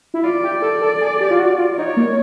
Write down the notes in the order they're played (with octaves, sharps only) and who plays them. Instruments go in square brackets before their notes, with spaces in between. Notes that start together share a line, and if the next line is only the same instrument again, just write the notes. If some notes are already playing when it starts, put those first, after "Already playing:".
[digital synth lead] E4
[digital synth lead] F4 [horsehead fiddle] D5
[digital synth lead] G4
A4
A4
G#4
G4
F4
F#4
F4
[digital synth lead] D#4 [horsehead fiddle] C#5
[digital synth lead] A#3